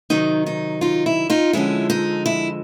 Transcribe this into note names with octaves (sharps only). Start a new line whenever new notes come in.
C3 D#3 F#3 D#4
D#4
D#4 F4
E4
D#4 F4
F2 D3 F3 G#3 C#4 E4
D#4
E4